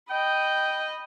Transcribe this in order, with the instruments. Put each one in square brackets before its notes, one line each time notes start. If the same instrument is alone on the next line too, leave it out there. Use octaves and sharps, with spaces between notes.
[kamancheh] D#5 B5 [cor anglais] G5